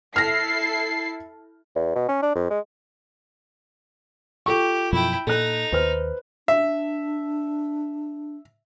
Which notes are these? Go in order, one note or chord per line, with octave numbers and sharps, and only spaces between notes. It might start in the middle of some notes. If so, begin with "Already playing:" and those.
E4 A4 F6 A#6 C7
E2
B2
C#4
D4
F2
G#3
F4 G4 A4 C#6
F#2 B2 F3 E4 G5
A#2 D#4 A4 F#6
D#2 B4 C5 F6
D4 E5